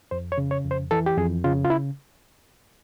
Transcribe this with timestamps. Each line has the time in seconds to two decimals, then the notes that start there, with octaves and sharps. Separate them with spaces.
0.11 F2 C5
0.32 C#5
0.38 C#3
0.51 C#5
0.65 F2
0.71 C5
0.91 E3 A4
1.06 G4
1.17 F2 G#4
1.44 C#3 F4
1.65 F4
1.70 E4